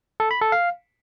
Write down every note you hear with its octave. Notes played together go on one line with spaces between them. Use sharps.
A4
B5
A4
F5